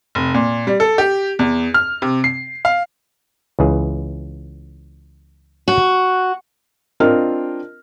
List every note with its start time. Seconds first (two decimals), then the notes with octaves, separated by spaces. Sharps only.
0.15 F1
0.34 A#2
0.67 G3
0.80 A4
0.98 G4
1.39 E2
1.74 F6
2.02 C3
2.24 C7
2.65 F5
3.59 C#2 E3 G#4
5.68 F#4
7.00 C4 D4 F4 A#4 D#5 F6